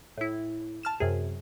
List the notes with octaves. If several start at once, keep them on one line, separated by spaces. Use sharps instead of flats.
A2 E4
A5 F6 E7
F#2 C3 G#4